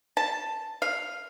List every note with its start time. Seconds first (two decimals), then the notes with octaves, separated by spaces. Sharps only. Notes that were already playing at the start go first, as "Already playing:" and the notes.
0.17 A5
0.82 F5